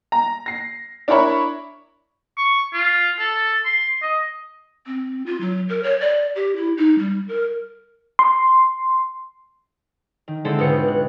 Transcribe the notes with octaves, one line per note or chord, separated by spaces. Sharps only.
A#5
A#6 C7
D4 E4 A#4 C#5 B5 C#6
C#6
F4
A4
C6
D#5
C4
F4
F#3
A#4
C#5
D5
G4
E4
D#4
G3
A#4
C6
D#3
D3 G#3 C4 E4 A4 C5
C#2 G#2 B2 B3 G5 C#7
F#6